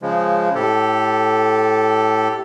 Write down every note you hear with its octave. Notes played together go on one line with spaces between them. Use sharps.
C#3 F3 G#3
A2 G4 A4